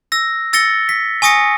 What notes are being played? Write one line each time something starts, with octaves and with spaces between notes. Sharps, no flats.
E6 A#6
E6 A6 A#6 C#7 G7
B6
G#5 C#6 D#6 A#6 C#7